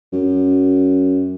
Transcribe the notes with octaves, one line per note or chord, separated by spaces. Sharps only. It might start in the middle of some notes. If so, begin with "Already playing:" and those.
F#2